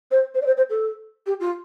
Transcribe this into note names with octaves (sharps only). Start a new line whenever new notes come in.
C5
C5
D5
C5
C5
A4
G4
F4